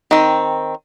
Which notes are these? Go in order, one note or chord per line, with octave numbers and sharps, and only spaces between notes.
D#3 C4